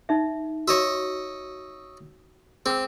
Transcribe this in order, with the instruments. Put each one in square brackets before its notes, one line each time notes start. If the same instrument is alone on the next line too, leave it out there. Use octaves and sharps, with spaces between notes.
[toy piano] D#4 E5
[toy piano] F#4 [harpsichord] C#5 D#5 E5
[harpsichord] C4 [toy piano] G#4 E6